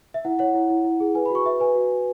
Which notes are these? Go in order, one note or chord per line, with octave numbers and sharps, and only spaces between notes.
E5
E4 F#5
C#5 F#5
E4
E4
E4
G#4
B4 G#5
B5
F#4 C#6
B4 E5
B4 G#5
F#4
F#4